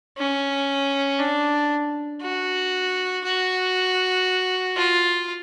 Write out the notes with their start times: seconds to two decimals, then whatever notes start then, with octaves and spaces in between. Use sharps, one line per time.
0.18 C#4
1.20 D4
2.22 F#4
3.24 F#4
4.77 F4